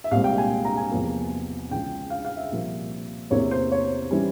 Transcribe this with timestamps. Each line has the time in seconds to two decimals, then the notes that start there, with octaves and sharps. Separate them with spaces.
0.04 E5
0.11 C2 A#2 G#3 C4 F5
0.24 G5
0.38 G#5
0.65 A#5
0.77 G#5
0.91 E2 C3 F3 A#3
1.71 C#2 C#3 E3 G5
2.10 F5
2.25 F5
2.37 E5
2.51 C2 A#2 F3 A#3
3.30 E2 C3 E3 A#3 C#5
3.51 C5
3.72 C#5
4.11 E3 G3 C#4